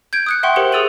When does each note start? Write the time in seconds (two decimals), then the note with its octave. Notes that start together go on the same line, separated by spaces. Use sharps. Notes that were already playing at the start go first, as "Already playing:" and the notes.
0.13 G6 G#6 D7
0.26 D#6 F#6 C#7
0.43 E5 F#5 G5 C6 C#6
0.56 G4 A#4 C5 C#7 F#7
0.72 G#4 D#6 E6 A6 D#7 F#7